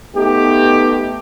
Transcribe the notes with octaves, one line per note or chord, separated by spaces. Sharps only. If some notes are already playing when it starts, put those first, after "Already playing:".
A3 B3 D#4 G4